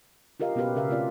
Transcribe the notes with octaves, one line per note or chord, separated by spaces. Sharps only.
F4 G4 A#4 D#5 F5
B2 B3 C#4 F#4 G4 B4
C#3 C#4 A#4 E5 F5
A3 C4 F4 D5